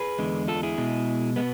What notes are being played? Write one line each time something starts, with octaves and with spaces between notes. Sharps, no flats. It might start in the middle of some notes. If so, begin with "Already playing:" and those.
Already playing: G#4 B4
E2 D3 G#3
F4 A4
E4 G#4
B2 G#3
B2 G#3 B3